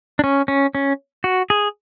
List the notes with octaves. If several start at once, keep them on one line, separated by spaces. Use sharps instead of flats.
D4
C#4
C#4
C#4
F#4
G#4